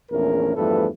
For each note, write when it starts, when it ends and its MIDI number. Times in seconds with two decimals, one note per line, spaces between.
0.12 0.52 34
0.12 0.52 40
0.12 0.52 57
0.12 0.52 61
0.12 0.52 70
0.56 0.87 40
0.56 0.87 43
0.56 0.87 53
0.56 0.87 57
0.56 0.87 69
0.56 0.87 71